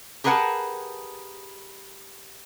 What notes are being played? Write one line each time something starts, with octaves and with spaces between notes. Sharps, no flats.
G4 G#4 A#4 B4 F#5 A5